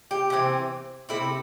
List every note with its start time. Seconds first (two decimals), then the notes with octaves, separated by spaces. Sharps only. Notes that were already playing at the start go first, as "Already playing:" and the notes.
0.11 G4
0.30 C3 E3 C4
1.09 C3 A3 C4 E4